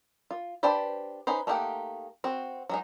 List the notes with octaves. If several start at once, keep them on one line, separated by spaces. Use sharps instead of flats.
F4
D4 G4 B4 C5 D5
C#4 D#4 B4 C5
A3 A#3 D#4 G4 F#5
C4 F#4
F#3 G#3 D#4